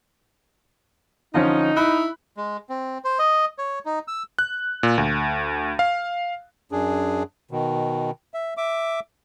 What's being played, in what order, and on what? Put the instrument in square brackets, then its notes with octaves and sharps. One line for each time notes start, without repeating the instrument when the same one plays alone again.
[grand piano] D3 F3 C#4 [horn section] D#4
[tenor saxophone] E4 [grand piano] B5 F#6
[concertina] G#3
C4
C5
D#5
C#5
D#4
E6
[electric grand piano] F#6
A#2
D2
F5
[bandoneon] F#2 D4 G#4
B2 D#3
E5
E5 D6